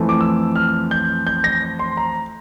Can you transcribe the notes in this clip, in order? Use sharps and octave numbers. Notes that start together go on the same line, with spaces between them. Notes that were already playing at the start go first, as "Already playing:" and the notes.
Already playing: F2 E3 A3
D6
E6
F6
G6
G6
A#6
C6
A#5